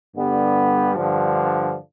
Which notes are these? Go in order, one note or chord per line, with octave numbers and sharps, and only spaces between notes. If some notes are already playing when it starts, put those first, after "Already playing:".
G2 D3 G3 B3
G2 D3 F3